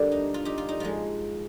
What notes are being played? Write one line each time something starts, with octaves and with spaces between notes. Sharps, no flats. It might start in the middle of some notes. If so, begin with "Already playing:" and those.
Already playing: D3 G3 A#3 D4
D#4
F4
D#4 G4
F4
D#4
G#2 F3 G#3 F4